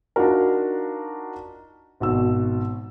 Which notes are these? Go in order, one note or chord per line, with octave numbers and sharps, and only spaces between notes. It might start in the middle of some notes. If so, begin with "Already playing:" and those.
D4 D#4 F4 F#4 A#4
G#1 B2 E6